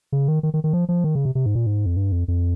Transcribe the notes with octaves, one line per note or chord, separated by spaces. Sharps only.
C#3
D#3
D#3
D#3
D#3
F3
F3
D#3
C#3
C3
C3
G#2
A#2
G#2
F2
G2
F2
F2